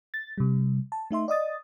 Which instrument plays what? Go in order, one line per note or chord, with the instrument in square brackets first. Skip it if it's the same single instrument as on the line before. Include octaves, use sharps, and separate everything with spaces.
[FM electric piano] A6
C3 G3
A5
A3 D#4 E5 C6
D5 D#5 D#6 A6